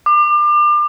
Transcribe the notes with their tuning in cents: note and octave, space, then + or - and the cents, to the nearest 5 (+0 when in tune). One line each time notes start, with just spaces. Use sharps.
D6 +30